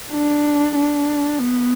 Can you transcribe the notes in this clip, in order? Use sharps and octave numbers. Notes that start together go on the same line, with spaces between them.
D4
D4
B3